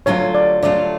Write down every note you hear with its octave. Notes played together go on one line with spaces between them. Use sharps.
D3 F#3 A3 F4 C#5
D5
D3 F#3 A3 F4 D5